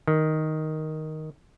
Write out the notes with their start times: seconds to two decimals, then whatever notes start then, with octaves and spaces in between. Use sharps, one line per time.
0.08 D#3